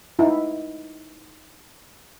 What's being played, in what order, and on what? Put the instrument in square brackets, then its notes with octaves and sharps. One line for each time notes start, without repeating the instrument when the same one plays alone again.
[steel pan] D#4 E4